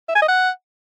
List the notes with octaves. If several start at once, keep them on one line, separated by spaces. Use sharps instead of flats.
E5
G#5
D#5
F#5